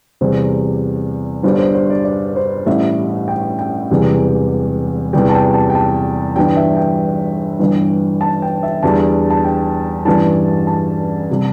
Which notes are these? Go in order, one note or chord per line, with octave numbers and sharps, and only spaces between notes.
E2 C3 G3 C5
G1 G2 D3 G3 C5
C5
C5
D5
D5
C5
A1 A2 G3 E5
G5
G5
E1 E2 C3 E3 G3
E2 C3 E3 G3 G5
A5
G5
A5
G5
A5
G1 G2 E3 G3 G5
E5
G5
G1 G2 E3
A5
G5
E5
E2 D3 G3 A5
A5
G5
A1 G2 E3 G3 A5
A5
C3 G3